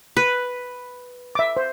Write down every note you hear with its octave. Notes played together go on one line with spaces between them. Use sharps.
B4
E5 D6
C5